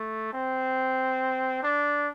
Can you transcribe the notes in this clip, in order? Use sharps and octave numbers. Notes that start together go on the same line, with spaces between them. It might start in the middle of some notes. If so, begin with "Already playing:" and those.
Already playing: A3
C4
D4